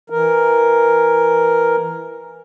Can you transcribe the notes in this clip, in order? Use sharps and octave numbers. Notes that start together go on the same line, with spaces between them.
E3 A#4